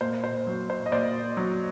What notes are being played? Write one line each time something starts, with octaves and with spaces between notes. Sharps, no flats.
A#2 C5
C5
F#3
C5
D#5
A#2 C5 D5
F#3